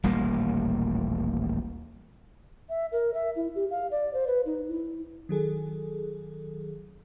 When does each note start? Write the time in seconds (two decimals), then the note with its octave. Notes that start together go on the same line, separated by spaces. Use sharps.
0.04 D#1 A1 G3 A#3
2.69 E5
2.92 A#4
3.14 E5
3.36 E4
3.55 G4
3.71 F5
3.91 D5
4.14 C5
4.27 B4
4.46 D#4
4.69 E4
5.29 D#3 F#3 G#4 A4